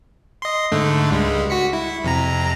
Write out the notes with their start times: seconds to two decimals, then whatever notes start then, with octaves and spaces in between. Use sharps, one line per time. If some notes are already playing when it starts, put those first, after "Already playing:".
0.42 D#5 C6
0.72 G#2 D3 A3
1.11 C#2 G3 G#3
1.50 F#4 B6 C#7
1.73 E4
2.04 F2 C3 A#5